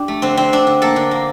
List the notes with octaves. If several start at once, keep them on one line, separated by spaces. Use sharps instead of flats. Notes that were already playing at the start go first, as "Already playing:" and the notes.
Already playing: D4 G4
A3
D3 C4
D3 C4
D3 D4
D3
A#3 A4
D3
A#3